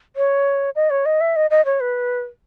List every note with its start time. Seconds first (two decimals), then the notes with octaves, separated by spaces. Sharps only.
0.16 C#5
0.76 D#5
0.90 C#5
1.06 D#5
1.21 E5
1.36 D#5
1.51 D#5
1.65 C#5
1.81 B4